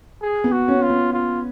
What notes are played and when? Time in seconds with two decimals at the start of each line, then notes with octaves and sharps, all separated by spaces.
0.22 G#4
0.44 B3
0.52 F#4
0.68 C#4
0.82 F4
0.90 B3
1.13 F4